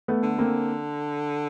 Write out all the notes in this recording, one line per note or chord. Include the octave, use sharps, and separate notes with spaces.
A3 B3
D3
A#3 C4